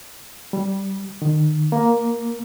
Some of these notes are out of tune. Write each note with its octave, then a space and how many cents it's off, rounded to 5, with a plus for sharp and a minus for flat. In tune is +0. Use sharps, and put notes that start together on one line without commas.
G3 -10
D#3 -30
A#3 +5